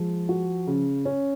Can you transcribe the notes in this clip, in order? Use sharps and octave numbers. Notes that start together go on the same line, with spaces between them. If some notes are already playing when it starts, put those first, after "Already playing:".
Already playing: F3 G#3
F#4
C#3
C#4